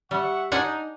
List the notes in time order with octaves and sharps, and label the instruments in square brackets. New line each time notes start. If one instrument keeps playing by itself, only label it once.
[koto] G3 [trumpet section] E5 F#5 C#6
[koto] D4 F#5 G#5 [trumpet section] D#4